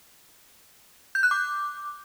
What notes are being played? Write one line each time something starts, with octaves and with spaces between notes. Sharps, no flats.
G6
F#6
D6